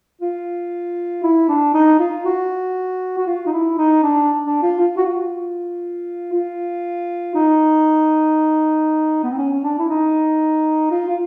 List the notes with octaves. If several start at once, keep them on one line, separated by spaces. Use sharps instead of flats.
F4
E4
D4
D#4
F4
F#4
F#4
F4
D#4
E4
D#4
D4
D4
F4
F4
F#4
F4
F4
D#4
B3
C4
C#4
C#4
D4
E4
D#4
F4
F4